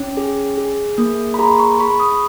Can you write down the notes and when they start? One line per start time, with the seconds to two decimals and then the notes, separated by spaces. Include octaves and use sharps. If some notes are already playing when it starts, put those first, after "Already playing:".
Already playing: C#4
0.17 G#4
0.58 G#4
0.98 A#3
1.34 B5
1.39 G#4 A#5 C6
1.59 B5 C#6
1.80 G#4 B5 C#6
2.00 C#6 D#6